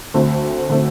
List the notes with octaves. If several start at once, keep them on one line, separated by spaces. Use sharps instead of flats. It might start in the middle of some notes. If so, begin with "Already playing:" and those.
D2 D3 A3 C4
D3 A3 C4